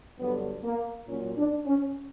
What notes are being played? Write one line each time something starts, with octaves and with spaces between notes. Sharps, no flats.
G2 D3 F#3 B3
A#3
A#2 F#3 C#4
D4
C#4